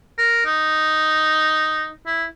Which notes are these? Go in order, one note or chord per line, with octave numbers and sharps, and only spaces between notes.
A#4
D#4
E4